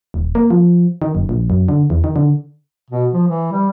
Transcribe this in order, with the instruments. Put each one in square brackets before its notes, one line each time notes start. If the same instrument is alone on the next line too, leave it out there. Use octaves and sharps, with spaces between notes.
[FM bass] D#1
A#3
F3
D#3
F#1
A#1
F#2
D3
E2
D#3
D3
[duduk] B2
F3
E3
G3